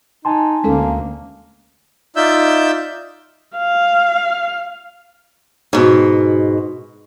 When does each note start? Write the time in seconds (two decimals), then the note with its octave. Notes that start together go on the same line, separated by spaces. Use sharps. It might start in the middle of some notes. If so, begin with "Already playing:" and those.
0.25 D#4 G#5 A5 C6
0.64 D2 D3 G#3 A#3 C#4 A4
2.16 D#4 F4 D5 E5 E6 G6
3.57 F5
5.73 G#2 B2